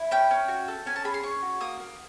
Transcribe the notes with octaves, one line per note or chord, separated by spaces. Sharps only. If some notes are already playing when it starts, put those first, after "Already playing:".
Already playing: E4
C#4 G5
C#4
F#4
A4
C#4 G#5
A5
G#4 B5
C6
C#4 C#6
F#4
A#3 D#6
A#3